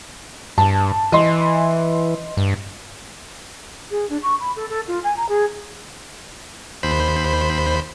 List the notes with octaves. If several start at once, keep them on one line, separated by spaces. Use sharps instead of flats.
G2 A5
E3 D#5 C6
G2
G#4
D4
C#6
B5
A4
A4
F4
G#5
A#5
G#4
D#2 C5 B5